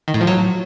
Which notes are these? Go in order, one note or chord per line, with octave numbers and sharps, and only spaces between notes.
D#3
A2
F3
F#3